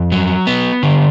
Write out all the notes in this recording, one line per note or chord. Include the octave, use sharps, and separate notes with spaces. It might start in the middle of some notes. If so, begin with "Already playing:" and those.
Already playing: F2
F#3
B3
D3